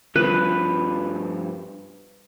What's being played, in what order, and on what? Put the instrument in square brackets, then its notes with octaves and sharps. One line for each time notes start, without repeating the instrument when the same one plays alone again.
[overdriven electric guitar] G2 F3 [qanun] B4